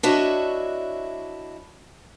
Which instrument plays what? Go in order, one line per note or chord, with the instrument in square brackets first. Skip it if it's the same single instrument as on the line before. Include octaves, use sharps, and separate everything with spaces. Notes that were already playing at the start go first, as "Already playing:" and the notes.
[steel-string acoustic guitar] D4 E4 F#4 C#5 D#5 E5